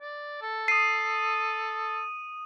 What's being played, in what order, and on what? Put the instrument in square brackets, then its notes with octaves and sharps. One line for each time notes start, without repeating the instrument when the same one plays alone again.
[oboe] D5
A4
[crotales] D#6 D#7 [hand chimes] C7